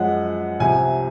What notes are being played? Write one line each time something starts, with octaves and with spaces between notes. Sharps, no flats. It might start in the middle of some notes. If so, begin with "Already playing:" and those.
Already playing: F#2 F3 G#3 F#5
C2 C3 F3 G#5